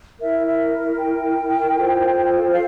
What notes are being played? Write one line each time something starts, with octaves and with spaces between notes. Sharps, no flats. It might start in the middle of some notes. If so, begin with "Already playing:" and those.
E4 A#4 E5
E5
G5
F4 A4 C5
F5